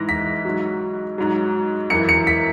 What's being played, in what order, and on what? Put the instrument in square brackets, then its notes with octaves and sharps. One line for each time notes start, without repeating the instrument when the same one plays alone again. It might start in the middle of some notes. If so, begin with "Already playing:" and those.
Already playing: [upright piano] G#2 E3 A#6
B6
G#2 F#3
G#2 F#3
F#2 E3 C#7
C#7
B6